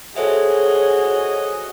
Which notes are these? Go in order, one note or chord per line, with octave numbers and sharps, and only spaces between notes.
F#4 G#4 A4 C5 C#5 D#5 E5